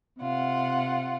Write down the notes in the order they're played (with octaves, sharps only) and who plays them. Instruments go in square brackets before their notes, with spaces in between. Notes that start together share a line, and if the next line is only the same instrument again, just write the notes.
[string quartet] C3 F4 F#5